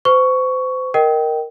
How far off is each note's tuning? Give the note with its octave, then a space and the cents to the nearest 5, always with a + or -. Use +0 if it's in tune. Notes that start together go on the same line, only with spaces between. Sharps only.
C5 -35 C#6 +10
A#4 +0 D#5 +0 G5 -15